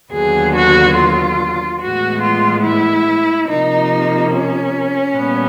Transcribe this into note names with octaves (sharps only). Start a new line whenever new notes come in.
D#2 D3 F#3 B3 G#4
F#4
F4
A2 E3 G#3 B3 F#4
F4
E4
C3 F3 A#3 D#4
C#4
A#2 G3 B3